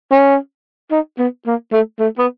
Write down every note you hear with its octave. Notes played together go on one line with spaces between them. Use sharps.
C#4
D#4
B3
A#3
A3
A3
B3